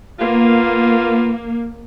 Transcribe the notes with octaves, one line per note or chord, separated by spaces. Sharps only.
A#3 B3 F4